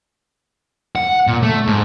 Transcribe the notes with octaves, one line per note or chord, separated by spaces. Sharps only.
F#5
A#2
A3
G#2